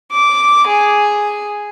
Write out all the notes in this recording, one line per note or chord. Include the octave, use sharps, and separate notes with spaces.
D6
G#4